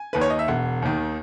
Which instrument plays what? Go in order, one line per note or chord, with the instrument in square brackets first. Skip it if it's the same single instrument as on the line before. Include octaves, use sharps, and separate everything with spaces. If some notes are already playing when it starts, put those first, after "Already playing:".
Already playing: [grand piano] G#5
D#2 D#3 B4
C#5
D#5
E5
E1 F#5
D#2 D#3